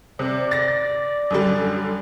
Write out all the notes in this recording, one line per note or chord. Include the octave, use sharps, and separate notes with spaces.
C3 D5
A6 A#6
F#2 D3 G3